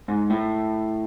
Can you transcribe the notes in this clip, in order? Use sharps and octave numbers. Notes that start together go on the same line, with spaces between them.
G#2
A2